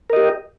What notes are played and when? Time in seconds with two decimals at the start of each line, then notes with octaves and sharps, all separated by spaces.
0.10 A#4
0.13 D#5
0.16 G4